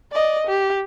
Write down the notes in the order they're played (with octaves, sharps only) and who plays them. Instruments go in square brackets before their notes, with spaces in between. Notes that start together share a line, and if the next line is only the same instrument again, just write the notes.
[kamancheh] D5 D#5
G4